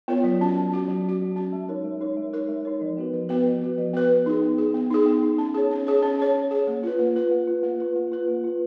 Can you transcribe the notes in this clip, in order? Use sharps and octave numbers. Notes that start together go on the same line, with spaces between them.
B3 F4 A#4 C#5
F#3
C#4 F#4
F#3
C#4 F#4
F#3
C#4 F#4
F#3
C#4 F#4
G#3
D#4 A#4 C#5
G#3
D#4 A#4 C#5
G#3
D#4 A#4 C#5
G#3
D#4 A#4 C#5
F3
B3 F#4 B4
F3
B3 F#4 B4
F3
B3 F#4 B4
F3
B3 F#4 B4
B3
D#4 G#4
B3
D#4 G#4
B3
D#4 G#4
B3
D#4 G#4
C#4
G#4 C#5
C#4
G#4 C#5
C#4
G#4 C#5
C#4
G#4 C#5
A#3
F4 B4
A#3
F4 B4
A#3
F4 B4
A#3
F4 B4
A#3
F4 B4
A#3
F4 B4